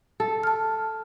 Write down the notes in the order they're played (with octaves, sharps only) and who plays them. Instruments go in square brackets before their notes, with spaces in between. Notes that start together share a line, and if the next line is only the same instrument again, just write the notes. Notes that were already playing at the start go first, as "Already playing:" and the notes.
[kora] A4
[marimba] A5 F6